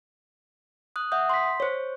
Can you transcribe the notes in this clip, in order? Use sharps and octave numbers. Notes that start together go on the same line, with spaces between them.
D#6 F#6
E5 F#5 D#6 G6
C6 B6
C5 C#5